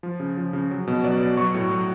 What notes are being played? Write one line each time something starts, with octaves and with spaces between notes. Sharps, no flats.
F3
C#3
F3
C#3
F#3
B2
F#3 D5
B2
F#3 C#6
A2
F#3